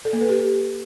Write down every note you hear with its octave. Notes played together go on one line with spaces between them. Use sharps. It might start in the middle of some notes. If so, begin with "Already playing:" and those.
A4
A#3
B4
G4